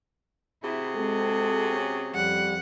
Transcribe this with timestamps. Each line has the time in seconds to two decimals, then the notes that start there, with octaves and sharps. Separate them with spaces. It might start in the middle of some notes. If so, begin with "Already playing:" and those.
0.63 C3 E4 F#4 G#4
0.95 G#3 C4 A4
1.69 C#4
2.14 F2 G3 F#5